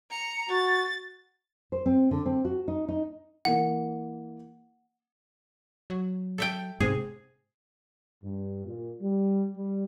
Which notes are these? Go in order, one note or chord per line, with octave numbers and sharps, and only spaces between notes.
A#5 C#7
F#4 A6
C5
C4
D3
C4
F#4
D#4
D#4
E3 A#3 F#5
F#3
A4 E5 G5
G#2 C3 C4 G#4
G2
A#2
G3
G3